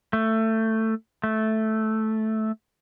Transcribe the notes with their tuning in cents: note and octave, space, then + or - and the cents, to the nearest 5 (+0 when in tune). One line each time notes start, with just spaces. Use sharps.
A3 +15
A3 -5